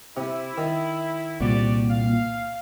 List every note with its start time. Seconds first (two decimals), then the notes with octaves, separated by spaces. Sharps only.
0.17 C3 E4
0.58 D#3
1.40 C2 A#2 F#4 G4 D5
1.90 F5